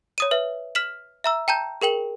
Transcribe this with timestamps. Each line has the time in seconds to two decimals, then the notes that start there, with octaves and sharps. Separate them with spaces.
0.18 C#5 D#6 D#7
0.31 B4 E5
0.75 F6 B6 E7 F#7
1.24 E5 A#5 E6
1.48 G5 A5 A#5 G6
1.82 G#4 A#4 G5 F#7